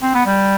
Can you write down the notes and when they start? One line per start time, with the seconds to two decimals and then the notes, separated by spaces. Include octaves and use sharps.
0.03 C4
0.14 B3
0.26 G3